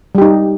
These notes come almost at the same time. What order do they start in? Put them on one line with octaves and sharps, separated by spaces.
G3 G4 D#4